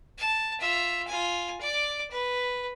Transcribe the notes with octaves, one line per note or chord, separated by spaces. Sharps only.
A5
F4 E5
F4 G#5
D5 D6
B4